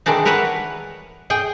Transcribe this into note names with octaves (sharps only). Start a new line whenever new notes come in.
D#3 E3 G#3 D4 D#4
A#4 B4 C#5 E5 F#5
G#4 G5 G#5